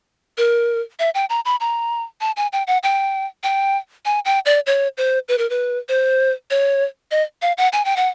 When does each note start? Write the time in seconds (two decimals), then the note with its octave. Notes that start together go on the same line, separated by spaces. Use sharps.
0.38 A#4
0.99 E5
1.15 G5
1.30 A#5
1.45 B5
1.60 A#5
2.21 A5
2.37 G#5
2.53 G5
2.67 F#5
2.83 G5
3.43 G5
4.05 G#5
4.25 G5
4.46 D5
4.66 C#5
4.97 C5
5.28 B4
5.38 A#4
5.50 B4
5.89 C5
6.51 C#5
7.11 D#5
7.42 F5
7.58 F#5
7.73 G#5
7.85 G5
7.96 F#5